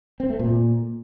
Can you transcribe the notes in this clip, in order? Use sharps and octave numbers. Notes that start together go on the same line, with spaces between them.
C4
A3
A#2